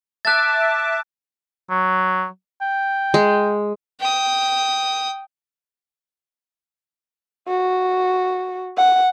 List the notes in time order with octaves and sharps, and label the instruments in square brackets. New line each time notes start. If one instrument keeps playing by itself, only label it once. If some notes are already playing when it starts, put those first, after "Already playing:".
[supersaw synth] E5 A5 D6 [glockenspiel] F#6 A6
[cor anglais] F#3
G5
[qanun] G#3
[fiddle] G5 D#6
[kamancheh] F#4
F#5